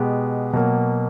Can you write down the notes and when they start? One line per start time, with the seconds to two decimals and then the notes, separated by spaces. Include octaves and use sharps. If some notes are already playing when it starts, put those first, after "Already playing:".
Already playing: B2 G#3 B3 G4
0.53 B2 F#3 A#3